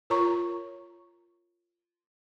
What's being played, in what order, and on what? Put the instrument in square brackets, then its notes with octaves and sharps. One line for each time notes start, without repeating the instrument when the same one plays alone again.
[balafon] F4 A#4 C#5 A#5 C#6